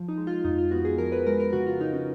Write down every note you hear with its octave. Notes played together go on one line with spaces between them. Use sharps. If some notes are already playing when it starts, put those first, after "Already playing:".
Already playing: F3
D#4
G#3
F4
F2 D#4
F4
B3 F#4
G#4
F3 A#4
B4
G#3 A#4
A#4
C#3 F#4
F4
C#3 D#4
C#4